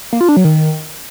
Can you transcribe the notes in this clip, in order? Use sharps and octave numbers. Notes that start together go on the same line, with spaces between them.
A#3
F4
D4
F#3
D#3